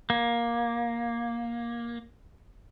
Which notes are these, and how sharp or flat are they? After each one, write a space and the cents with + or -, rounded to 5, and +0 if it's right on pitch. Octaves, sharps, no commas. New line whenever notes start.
A#3 +15